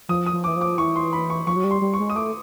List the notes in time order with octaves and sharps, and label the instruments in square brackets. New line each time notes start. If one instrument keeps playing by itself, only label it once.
[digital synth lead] F3 [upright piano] D#6
[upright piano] D#6
[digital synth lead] F3
[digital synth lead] E3 [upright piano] D6
[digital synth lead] F3
[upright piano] D6
[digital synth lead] E3 [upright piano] C#6
[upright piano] C6
B5
C#6
[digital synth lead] F3 [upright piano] C#6
[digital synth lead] F#3
G3
[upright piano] C6
[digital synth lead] G3
[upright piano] C#6
[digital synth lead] G#3
[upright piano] D#6
[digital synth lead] A3 [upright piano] D6